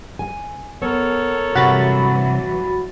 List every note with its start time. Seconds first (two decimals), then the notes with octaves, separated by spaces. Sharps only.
0.19 G#5
0.82 B3 A4 A#4 C#5
1.55 G2 C3 E3 F#3 F#4 B5 A6